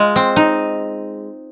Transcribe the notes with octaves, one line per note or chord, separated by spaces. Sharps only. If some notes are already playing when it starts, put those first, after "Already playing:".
Already playing: G#3 F4
C4
D#4